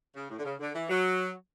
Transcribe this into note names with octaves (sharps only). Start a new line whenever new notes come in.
C#3
A2
D3
C#3
D3
E3
F#3